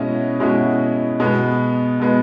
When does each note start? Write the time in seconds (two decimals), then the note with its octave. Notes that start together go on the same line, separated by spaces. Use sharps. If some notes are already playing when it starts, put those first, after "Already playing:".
Already playing: B2 G#3 C#4 E4 D#5
0.40 B2 G#3 C#4 E4
1.20 B2 G#3 B3
2.00 B2 G#3 B3